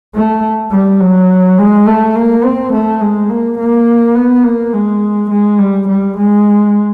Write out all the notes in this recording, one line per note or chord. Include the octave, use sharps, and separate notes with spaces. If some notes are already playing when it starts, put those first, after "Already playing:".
A3
G3
F#3
G#3
A3
A#3
C4
A3
G#3
A#3
A#3
B3
A#3
G#3
G#3
G3
G3
G#3